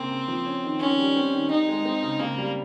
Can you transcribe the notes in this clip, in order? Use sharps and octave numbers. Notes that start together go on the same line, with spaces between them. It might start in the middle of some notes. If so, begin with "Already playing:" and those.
Already playing: C#3 A#3 C4
C#3
F3
C#4
D#3
D#3 C#4
G3
C4
D#3
D#3 D#4
G#3
C4
C#3
C#3 A#3
G3